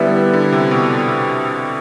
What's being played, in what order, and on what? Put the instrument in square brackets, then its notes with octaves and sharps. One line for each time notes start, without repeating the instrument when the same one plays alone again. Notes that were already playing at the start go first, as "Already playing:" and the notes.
Already playing: [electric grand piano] D3 [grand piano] G3 B3 E4
[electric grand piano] D3
C3
B2